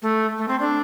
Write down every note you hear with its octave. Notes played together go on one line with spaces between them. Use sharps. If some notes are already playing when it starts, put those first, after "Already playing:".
A3
A3
C4
D4